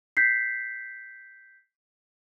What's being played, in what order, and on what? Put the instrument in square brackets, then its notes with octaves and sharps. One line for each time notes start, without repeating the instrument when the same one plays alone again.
[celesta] G6 B6 C7